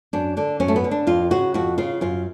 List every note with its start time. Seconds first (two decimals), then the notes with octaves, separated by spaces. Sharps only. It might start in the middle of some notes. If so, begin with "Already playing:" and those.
0.13 F#2 D4
0.37 D3 D4
0.60 F#2 C#4
0.68 A3
0.76 B3
0.84 D3
0.91 D4
1.07 F2 F4
1.31 C#3 F#4
1.54 F2 F#4
1.78 C#3 F4
2.01 F#2 F4